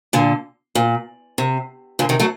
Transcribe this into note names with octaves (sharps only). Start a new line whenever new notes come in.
A#2 D3
A#2
C3
A#2 D3
C3 D#3
F#3 A3